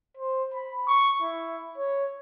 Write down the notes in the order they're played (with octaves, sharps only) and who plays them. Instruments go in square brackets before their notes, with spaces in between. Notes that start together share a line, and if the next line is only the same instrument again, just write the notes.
[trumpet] C5
B5
C#6
E4
C#5